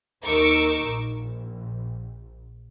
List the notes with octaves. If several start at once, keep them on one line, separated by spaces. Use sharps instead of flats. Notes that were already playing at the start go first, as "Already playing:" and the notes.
D#2 D#4 A#4 C#6 D6 E6
A#1